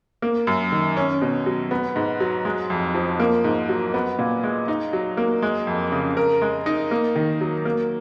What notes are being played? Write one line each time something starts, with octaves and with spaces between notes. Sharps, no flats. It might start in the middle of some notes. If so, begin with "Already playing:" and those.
A#3
F#2
D#3
C#4
B2
F#3
B3
G#2
F#3
G#3
F2
F3
A#3
G#2
F#3
B3
A#2
G#3
D#4
F#3
A#3
G#3
F2
C#3
A#4
G#3
D#4
A#3
D#3
F#3
A#3